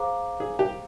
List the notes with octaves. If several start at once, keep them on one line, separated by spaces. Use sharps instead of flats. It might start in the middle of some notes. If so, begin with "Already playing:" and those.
Already playing: G#4 C5 F5 A#5 D6
G#4
G4